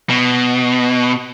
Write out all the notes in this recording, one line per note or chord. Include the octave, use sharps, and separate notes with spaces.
B2